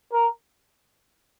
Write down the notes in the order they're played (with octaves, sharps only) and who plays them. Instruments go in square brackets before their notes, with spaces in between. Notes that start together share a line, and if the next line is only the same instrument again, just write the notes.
[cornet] A#4